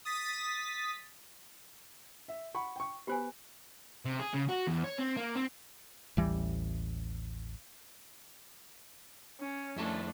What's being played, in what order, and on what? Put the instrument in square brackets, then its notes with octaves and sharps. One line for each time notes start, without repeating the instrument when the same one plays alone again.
[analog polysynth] D#6 A6 B6
[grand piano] E5
F#5 B5 C#6
G5 C#6
[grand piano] B3 B5 [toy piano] G4 C5 G#5
[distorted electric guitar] C3
G#4
C#3
F#4
E2
C#5
C4
A#3
C4
[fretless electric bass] A1 D#2 E3 G3
[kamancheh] C#4
[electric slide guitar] F2 E4 A5 [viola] A3 D4